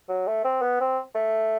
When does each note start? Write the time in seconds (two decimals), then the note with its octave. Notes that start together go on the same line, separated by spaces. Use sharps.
0.09 F#3
0.27 A3
0.44 C4
0.62 B3
0.80 C4
1.15 A3